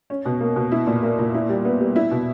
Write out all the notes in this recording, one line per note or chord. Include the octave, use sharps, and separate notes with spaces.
C#4
B2
A#3
B2
E4
A#2
A#3
A#2
E4
G3
B3
G3
E4
B2